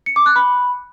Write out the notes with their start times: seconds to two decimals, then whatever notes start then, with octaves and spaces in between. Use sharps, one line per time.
0.06 C#7
0.16 D6
0.26 F#6
0.36 B5